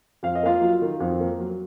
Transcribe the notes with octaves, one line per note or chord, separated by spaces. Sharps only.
F2 F5
D#5
A#3 F4 F5
F#3
D#3
F2
A#3
F#3